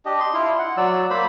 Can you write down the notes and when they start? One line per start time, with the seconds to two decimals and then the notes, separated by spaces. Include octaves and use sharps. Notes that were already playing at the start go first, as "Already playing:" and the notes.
0.06 D4 G4 D#5
0.20 C6
0.34 E4 F4
0.59 F#5
0.77 F#3 D5 E6
1.10 A#3 C5 B5